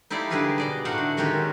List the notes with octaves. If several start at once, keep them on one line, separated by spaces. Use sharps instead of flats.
D#4 E4 G4 A4 D5 F5
D3 G3 D#4 G#4 B4 F5
B2 D5 D#5
A2 A3 D#4 F#4 F5 F#5
D3
D#3 G#3 C#4 F#4 G4 A#4